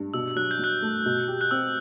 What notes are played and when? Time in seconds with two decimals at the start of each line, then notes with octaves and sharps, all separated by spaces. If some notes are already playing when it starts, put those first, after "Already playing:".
Already playing: G2
0.14 B2 E6
0.36 F#3 F#6
0.51 G6
0.59 F#3 F#6
0.82 A3
1.06 B2
1.28 G4
1.41 F#6
1.51 C4 E6